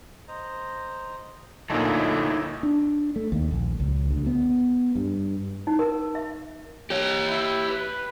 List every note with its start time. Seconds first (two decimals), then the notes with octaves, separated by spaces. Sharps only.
0.28 C5 D#5 A#5
1.70 D2 A#2 D#4 E4 A4 C#5 D#5 E5
2.63 D4
3.16 A3
3.32 D#2
3.51 A#1
3.80 C#2
4.11 D2
4.27 B3
4.96 G2
5.67 D#4
5.79 A#4
6.15 E5
6.90 G4 C#5
7.28 E4
7.69 B4